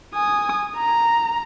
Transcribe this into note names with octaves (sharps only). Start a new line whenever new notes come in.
G#5 D#6
A#5